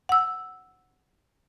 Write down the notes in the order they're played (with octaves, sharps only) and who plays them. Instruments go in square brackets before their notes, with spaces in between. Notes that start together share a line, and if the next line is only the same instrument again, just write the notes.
[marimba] F#5 E6